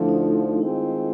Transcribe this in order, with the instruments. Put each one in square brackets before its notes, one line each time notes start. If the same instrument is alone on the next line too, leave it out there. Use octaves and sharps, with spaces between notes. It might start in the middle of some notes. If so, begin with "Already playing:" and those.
Already playing: [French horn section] D2 D3 F3 [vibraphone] A3 D4 E4 A4
[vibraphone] D#4
[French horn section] D#3 G#3 C4 F4 G#4 [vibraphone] E4